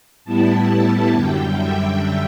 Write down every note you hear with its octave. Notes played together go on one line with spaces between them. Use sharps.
A2 G3 B3 E4 A5
F#2 D3 G3 G5
E5